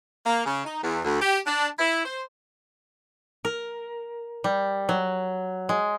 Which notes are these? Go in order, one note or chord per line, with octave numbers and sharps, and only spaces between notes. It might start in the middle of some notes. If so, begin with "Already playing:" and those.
A#3
C#3
D#4
E2
D2
G4
D4
E4
C5
A#4
G3
F#3
G#3